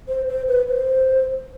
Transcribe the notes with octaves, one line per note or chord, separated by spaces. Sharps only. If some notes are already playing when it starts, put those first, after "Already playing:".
C5
C5
B4
C5